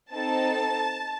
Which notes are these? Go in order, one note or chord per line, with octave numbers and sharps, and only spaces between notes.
C4 D#4 A4 A5